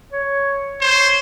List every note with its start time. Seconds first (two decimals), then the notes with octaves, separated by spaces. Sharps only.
0.12 C#5
0.81 C5 C#5